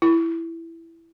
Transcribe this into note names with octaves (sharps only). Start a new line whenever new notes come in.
E4